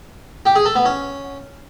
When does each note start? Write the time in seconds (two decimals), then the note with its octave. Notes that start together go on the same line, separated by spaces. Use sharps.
0.46 G4
0.56 G#4
0.65 A4
0.75 B3
0.85 C#4